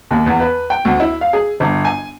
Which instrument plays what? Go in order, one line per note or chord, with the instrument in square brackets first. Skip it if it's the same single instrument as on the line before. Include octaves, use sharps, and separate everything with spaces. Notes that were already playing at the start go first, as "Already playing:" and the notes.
[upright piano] D#2
E2
B4
G5
D2
E4
F5
G#4
G1
G#5